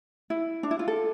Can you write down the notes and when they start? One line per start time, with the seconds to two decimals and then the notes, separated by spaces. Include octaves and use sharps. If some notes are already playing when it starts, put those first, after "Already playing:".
0.30 E4
0.63 D4
0.71 E4
0.79 F4
0.88 A4